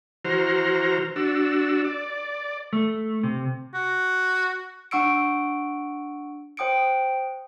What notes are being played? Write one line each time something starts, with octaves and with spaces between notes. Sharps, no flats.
E3 F#4 C5 A#5 F6
D4 F#4 E6
D5
A3
C3
F#4
D4 F#5 C#6 E6 C#7 D7
C5 G5 D#6 C#7 D7